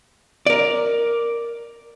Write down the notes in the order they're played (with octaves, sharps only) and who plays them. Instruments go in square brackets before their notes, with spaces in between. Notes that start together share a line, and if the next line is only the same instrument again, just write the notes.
[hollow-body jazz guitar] A#4 D5